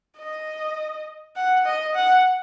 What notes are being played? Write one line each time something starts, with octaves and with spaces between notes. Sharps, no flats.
D#5
F#5
D#5
F#5